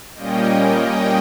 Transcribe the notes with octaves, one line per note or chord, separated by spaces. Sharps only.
A#2 G3 A#3 C#4 D#5 G5
D#5 G5